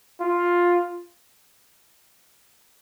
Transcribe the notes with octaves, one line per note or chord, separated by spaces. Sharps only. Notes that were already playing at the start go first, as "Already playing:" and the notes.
F4